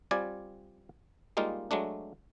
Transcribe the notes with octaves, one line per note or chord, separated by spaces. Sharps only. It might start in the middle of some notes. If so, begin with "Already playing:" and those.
G3 C4 F4 D5 G#5
G3 G#3 A#3 D#4 F4
F#3 G#3 A3 D4